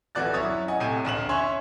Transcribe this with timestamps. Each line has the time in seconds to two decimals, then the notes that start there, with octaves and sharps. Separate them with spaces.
0.15 D1 E3 F#4 D5 F#6 A6
0.33 F#2 E4 C#5 D#6 A6
0.68 D#5 F#5 G#5
0.80 A2 C3 G#5 G6 D#7
1.05 A1 D2 E7 F#7
1.29 C#4 C#5 E5 G#5 C6